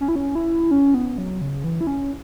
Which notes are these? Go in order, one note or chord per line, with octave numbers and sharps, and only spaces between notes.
C#4
E4
C#4
E4
C#4
B3
F#3
C#3
E3
E4
C#4